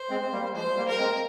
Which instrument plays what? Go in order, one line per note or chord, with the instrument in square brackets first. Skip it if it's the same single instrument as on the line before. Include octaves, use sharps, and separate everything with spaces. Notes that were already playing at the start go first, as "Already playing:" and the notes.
Already playing: [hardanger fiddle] C5
[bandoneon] G#3 C4
G3 A#3
[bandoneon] F3 G#3 [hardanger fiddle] C5
[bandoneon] G3 A#3
[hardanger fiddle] A#4
[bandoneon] G#3 C4